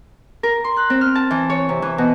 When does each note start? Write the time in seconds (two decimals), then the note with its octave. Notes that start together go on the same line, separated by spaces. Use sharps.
0.43 A#4
0.64 C6
0.77 F#6
0.90 C4
1.01 F6
1.15 A5
1.31 E3
1.50 C#5
1.69 C3
1.82 E3
1.98 B2